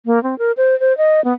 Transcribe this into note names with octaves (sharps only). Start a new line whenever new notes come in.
A#3
C4
A#4
C5
C5
D#5
B3